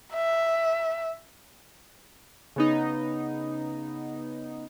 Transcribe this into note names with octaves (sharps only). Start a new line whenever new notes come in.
E5
C#3 B3 D#4